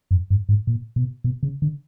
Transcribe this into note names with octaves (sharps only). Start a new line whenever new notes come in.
F#2
G2
G#2
A#2
B2
B2
C#3
D3